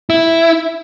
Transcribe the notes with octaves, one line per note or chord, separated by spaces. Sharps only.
E4